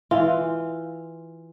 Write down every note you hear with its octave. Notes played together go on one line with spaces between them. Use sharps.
E3 F4